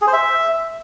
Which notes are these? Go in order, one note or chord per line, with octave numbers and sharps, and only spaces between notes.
G#4
C5
E5